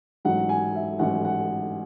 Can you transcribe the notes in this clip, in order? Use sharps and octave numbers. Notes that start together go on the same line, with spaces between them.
A1 G#2 F#3 F#5
G#5
E5
A1 G#2 F#3 F#5
F#5